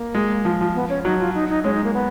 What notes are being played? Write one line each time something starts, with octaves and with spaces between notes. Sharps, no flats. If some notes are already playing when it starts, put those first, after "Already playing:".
Already playing: A#3
G#3
F3
F3
B3
C#4
F#3 D#4
F4
D#4
D#4
G#3 C#4
D#4
A#3
B3